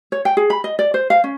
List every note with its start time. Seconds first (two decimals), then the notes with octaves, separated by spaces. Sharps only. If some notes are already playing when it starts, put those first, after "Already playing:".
0.12 C#5
0.25 G5
0.37 G#4
0.50 B5
0.64 D#5
0.79 D5
0.94 C5
1.10 F5
1.24 C#4